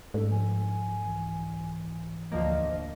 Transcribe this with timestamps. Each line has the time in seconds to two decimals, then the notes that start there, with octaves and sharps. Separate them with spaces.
0.14 G#2 A3 C#4 D4 A4
0.31 F3 G#5
1.06 C2 E3
2.32 D2 F3 A#3 D#5